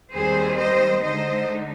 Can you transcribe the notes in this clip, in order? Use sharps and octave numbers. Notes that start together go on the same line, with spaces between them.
D#2 D#3 G3 C4 G#4 C5
C5 D#5
D3 G#3 D#4 C5 D#5